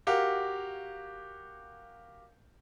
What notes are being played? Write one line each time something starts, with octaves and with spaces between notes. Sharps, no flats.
F#4 G4 A#4 F5